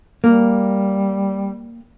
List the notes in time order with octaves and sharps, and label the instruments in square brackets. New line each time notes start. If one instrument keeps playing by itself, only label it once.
[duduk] G3 [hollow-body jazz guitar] A#3